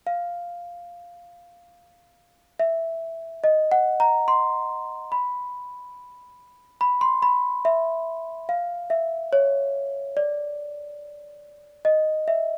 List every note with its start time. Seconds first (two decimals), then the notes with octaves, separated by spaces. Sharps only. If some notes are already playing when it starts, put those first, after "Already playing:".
0.07 F5
2.59 E5
3.44 D#5
3.72 F#5
4.00 A#5
4.28 C6
5.12 B5
6.81 B5
7.01 C6
7.22 B5
7.65 E5
8.49 F5
8.90 E5
9.33 C#5
10.17 D5
11.85 D#5
12.28 E5